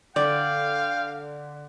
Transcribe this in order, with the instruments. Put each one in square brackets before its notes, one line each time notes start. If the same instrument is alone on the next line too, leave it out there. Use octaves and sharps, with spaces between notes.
[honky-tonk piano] D3 [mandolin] D5 [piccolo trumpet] F5 [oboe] G5